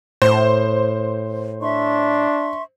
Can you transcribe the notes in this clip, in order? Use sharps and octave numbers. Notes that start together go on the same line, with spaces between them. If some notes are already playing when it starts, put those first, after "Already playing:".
A2 C5
D4 E5 C6 C#6